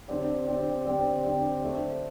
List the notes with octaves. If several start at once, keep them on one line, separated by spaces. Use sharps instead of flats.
D3 C4 G4 D5
D3 C4 G4 D5
D3 C4 G4 D5
D3 C4 G4 D5
A3 D4 C5